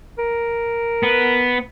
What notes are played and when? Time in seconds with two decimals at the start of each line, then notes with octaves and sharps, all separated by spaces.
0.19 A#4
1.03 B3